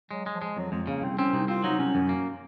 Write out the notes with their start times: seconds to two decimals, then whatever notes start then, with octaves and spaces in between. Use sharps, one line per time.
0.11 F#3 G#3
0.26 G#3
0.34 F3
0.42 G#3
0.57 F2 F#3
0.72 F2 G#3
0.87 C#3 A#3
1.02 C2 C4
1.18 C4 C#4
1.33 C2 D#4
1.48 C4 F4
1.64 F#3 D#4
1.79 C2 C#4
1.95 F#2
2.09 A#3